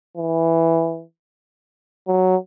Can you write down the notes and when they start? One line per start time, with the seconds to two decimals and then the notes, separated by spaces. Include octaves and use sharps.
0.17 E3
2.08 F#3